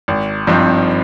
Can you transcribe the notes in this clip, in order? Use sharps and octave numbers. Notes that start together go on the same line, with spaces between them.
G#1
G2 F3 C4 D#4